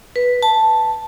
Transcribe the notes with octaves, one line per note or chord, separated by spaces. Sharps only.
B4
A5